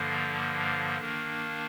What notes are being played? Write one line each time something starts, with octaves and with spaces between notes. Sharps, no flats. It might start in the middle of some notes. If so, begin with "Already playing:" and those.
Already playing: G2 D3 F3 A#3
D#3 A#3 D4